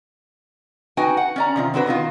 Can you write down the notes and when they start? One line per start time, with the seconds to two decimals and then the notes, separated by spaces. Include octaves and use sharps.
0.97 D#4 F#4 B4 G5 G#5
1.17 F#5
1.36 C#4 D5 A#5
1.56 C3 D#3 F4
1.74 C4 D4 F#4 B4
1.86 B2 D#3 D#4 F4